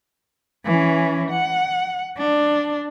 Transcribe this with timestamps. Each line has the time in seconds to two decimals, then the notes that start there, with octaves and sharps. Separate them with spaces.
0.65 E3 C#4
1.30 F#5
2.18 D4